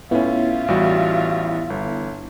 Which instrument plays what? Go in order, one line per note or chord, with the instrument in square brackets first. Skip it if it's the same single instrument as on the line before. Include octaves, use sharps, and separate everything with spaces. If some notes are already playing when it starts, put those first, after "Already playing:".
[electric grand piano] A2 C#4 [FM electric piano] B3 E4 [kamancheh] F4 E5
[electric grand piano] A1 G3 F#4
G1